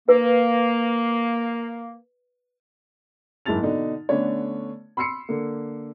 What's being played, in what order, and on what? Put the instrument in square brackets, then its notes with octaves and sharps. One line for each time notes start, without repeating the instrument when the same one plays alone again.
[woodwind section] A#3 [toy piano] B4
[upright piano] F#1 G#2 E4 A5 A6 F7
B2 D3 D4 D#4
D3 A3 B3 C#4 D4 C#5
B5 C6 E6 C7 C#7
D3 A#3